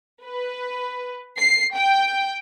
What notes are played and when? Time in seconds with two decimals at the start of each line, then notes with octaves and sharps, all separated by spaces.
0.24 B4
1.38 C7
1.74 G5